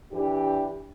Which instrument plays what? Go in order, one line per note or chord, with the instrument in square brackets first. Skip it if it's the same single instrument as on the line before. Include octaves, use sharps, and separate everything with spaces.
[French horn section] E3 D4 G4